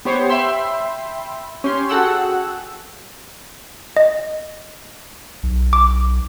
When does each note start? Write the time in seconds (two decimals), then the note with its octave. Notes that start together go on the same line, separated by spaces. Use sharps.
0.05 B3 G4 C5 C#5
0.29 E5 G5 B5 C6 E6
1.64 C#4 G4 C6
1.89 F#4 G#4 A4 F#5 G5 E6
3.97 D#5
5.43 B1
5.73 D6